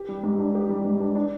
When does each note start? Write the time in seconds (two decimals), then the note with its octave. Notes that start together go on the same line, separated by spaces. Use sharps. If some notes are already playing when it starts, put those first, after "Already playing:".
Already playing: G4
0.09 G3
0.23 G#2
0.39 D4
0.55 G4
0.69 G3
0.85 G#2
1.01 D4
1.15 D4